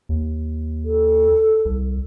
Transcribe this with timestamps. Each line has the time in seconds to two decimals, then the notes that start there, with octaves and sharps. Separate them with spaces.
0.09 D#2
0.85 A4
1.65 C2